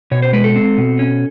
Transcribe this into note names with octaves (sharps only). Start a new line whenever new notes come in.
B2 C#5
C5
G#3 B4
A4
C4
B2
C#4